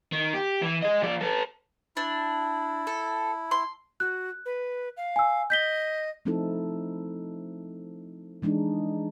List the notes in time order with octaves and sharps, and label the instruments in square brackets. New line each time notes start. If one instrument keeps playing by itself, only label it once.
[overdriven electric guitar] D#3
G4
E3
G#4 D#5
F3 D5
A4 B4
[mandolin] D4 [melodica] E4
[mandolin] A4
C6
[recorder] F#4 [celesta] F#6
[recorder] B4
F5
[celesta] G#5 E6
[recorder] D#5 [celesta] G6 B6 G7
[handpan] F3 A3 C4 D#4 E4 A4
E3 G#3 D4 D#4